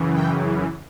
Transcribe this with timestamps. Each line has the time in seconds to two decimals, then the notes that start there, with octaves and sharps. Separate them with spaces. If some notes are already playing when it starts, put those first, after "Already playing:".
Already playing: F#2 C#3 E3
0.15 G5